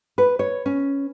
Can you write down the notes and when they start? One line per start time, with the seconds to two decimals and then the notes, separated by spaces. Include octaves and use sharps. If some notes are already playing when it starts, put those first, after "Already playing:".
0.18 B4
0.39 C#5
0.66 C#4